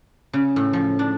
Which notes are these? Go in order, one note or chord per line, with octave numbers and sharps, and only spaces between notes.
C#3
A2
F3
D4